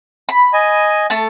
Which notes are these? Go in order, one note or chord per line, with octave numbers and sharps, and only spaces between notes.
B5
D#5 G#5
A3 A5